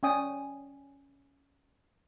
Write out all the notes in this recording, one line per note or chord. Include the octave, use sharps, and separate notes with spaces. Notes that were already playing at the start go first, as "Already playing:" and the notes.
C#4 D5 G5 G#5 D#6